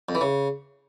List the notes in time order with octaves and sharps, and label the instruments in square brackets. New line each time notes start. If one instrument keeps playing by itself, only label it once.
[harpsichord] F2
E3
C#3